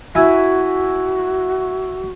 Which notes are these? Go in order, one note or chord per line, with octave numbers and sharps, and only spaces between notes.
E4 F#4 E5 G#5